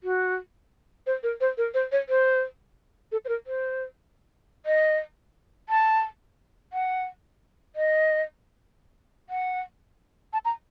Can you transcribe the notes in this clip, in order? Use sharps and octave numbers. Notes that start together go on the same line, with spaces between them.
F#4
C5
A#4
C5
A#4
C5
C#5
C5
A4
C5
A#4
C5
D#5
A5
F#5
D#5
F#5
A5
A#5